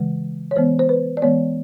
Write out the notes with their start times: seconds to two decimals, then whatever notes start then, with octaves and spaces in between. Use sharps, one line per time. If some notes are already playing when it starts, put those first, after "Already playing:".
Already playing: C#3 E3 G#3
0.51 C#5
0.56 E3 G#3 B3 C5
0.79 C5
0.89 B4
1.17 D5
1.22 E3 G#3 B3 C#5